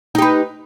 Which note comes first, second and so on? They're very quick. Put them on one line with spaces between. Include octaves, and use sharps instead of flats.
D#4 G4 B4